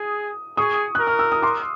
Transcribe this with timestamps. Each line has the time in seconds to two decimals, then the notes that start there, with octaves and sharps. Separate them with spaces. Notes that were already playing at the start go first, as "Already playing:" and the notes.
Already playing: G#4 D#6
0.57 G#4 C#6 D#6
0.95 A#4 F#6
1.07 F6
1.19 E6
1.32 D#6
1.42 C6 D6